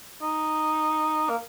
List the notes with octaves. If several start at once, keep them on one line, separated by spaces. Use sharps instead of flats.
D#4
A#3